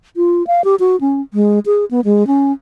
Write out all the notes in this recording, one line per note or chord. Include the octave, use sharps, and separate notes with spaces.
F4
F5
G4
F#4
C#4
G#3
G#4
B3
G#3
C#4